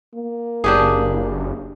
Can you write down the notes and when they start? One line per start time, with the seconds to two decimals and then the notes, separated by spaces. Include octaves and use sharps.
0.15 A#3
0.64 F#1 D4 G4 G#4